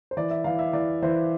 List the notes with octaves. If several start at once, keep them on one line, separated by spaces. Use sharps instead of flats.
C5
E3 D5
E5
E3 F5
E5
E3 D5
E3 C5